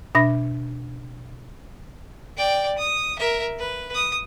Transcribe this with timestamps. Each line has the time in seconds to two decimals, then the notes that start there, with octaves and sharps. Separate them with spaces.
0.15 B2 D4 E5 B5 A#6
2.37 D5 G5
2.78 D#6
3.19 A#4 E5
3.59 B4
3.94 D#6